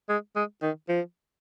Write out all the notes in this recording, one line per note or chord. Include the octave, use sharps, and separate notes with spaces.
G#3
G#3
D#3
F3